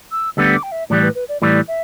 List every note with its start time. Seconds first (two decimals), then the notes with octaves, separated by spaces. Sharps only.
0.11 E6
0.37 D2 D3 G3 B3 E6
0.55 D6
0.63 G5
0.72 E5
0.90 A2 E3 G3 D5
1.02 B4
1.15 B4
1.29 D5
1.42 A2 E3 G3 D5
1.68 E5